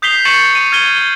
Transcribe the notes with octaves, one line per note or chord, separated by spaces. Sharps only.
D#6 G6 B6 C7 F7 G7
C#6 G6 A6 C#7 E7 F#7
D#7
F6 G#6 A6 D#7 G7